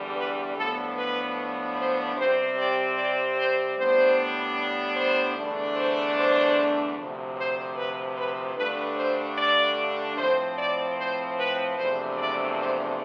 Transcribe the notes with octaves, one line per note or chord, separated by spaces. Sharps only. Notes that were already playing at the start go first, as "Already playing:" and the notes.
Already playing: E2 D3 G3
B4
A2 F3 B3 D4 A4
B4
C5
C3 G3 C4 C5
D5
D5
C5
A2 G3 B3 D4 C5
C5
E2 D3 A3 D4
C5
C5
D2 C3 F3
C5
B4
B4
G2 D3 A3 D4 B4
C5
D5
A2 F3 C4 C5
D5
C5
B4
E2 C3 F3 A3 D4 C5
D5
C5